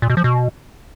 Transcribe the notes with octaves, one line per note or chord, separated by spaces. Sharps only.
A#2
B2
F3
B2